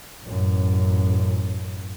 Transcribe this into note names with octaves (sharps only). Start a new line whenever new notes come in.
A1 F#2